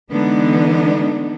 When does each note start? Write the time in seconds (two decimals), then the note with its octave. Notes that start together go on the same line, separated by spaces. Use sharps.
0.10 D3 E3 G#3 B3 D4 D#4